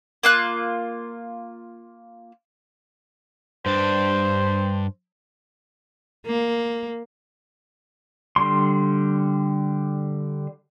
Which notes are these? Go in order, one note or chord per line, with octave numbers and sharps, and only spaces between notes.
A#3 F4 F#6
G2 D4 C5
A#3
D3 G3 C6